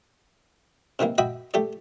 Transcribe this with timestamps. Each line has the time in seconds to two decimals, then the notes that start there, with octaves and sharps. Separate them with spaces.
0.99 C3 D#3 E3 A#3
1.18 F#4 D#5 E5 G5 B5 D#6
1.54 A3 G4 D5